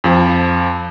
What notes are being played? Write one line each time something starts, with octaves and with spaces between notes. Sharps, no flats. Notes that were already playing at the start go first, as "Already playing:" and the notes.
F2 F3